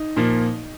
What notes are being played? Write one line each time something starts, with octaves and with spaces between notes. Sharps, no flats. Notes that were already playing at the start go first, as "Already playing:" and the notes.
Already playing: D#4
A#2 F3 A#3